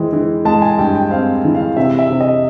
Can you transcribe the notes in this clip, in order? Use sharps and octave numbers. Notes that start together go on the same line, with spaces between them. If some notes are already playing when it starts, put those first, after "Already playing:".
Already playing: E3 G#3 C4
E3
G#3 A5
G#5
G2 G5
G5
C4 F5
E3
F5
C3 E5
E5
C3
D#5